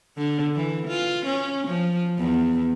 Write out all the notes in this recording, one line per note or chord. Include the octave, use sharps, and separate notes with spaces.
D3
E3
F4
C#4
F3
E2